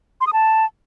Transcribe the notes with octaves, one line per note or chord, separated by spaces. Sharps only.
C6
D#6
A5